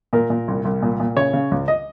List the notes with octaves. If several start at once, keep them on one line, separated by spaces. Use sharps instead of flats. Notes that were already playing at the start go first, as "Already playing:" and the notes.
A#2 A#4
A#2
C2
C2
A#2
A#2
C#3 C#5
C#3
C#2
D#5